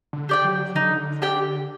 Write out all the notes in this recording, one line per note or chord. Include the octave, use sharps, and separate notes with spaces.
D3
G4 D5 G5
F#3
D3 D#4
G4 D5 G5